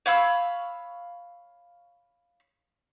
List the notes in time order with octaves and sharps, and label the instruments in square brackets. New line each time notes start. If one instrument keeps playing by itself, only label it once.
[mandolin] C#5 F5 B5 E6